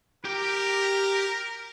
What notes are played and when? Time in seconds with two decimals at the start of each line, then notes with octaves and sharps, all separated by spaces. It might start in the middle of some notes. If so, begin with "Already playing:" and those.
0.25 G4 A#4 G5